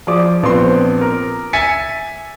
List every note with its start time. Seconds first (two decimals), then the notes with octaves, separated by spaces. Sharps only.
0.07 F3 G#4 D5 D6
0.43 A#1 B3 C4 C6
1.01 A#4
1.53 E5 G#5 A6 B6 C#7